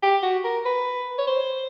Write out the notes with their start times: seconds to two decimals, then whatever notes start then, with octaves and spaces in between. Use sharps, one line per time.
0.03 G4
0.23 F#4
0.44 A#4
0.66 B4
1.19 C#5
1.27 C5